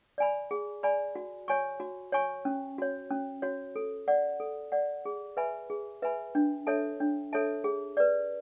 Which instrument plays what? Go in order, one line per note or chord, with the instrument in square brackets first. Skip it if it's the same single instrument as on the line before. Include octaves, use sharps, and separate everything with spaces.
[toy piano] D5 G#5 B5
G#4
D5 G#5 B5
F#4
C#5 G#5 C#6
F#4
C#5 G#5 C#6
C#4
F#4 C#5
C#4
F#4 C#5
A4
D5 F#5
A4
D5 F#5
G#4
B4 E5 G#5 B5
G#4
B4 E5 G#5 B5
D4
A4 C#5 E5 A5
D4
A4 C#5 E5 A5
G#4
B4 D5